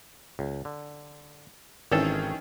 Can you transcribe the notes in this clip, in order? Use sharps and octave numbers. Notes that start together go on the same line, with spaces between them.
C#2
D3
G#1 D#3 E3 C#4 A4